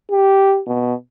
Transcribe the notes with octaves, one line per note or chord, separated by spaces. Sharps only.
G4
B2